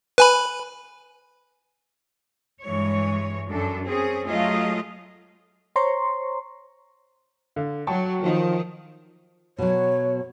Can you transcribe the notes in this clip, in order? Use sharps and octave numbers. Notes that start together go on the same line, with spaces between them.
B4 G#5 B5
G2 E3 G#3 C#5
F#2 D4 A4
C4 C#4 G#4
F#3 A3 F4 G#4 D#5 F5
C5 C#5 A#5 C6 C#6
D3 F5
F#3 G5 A5 C#6
D#3 F3
B2 F#3 C#5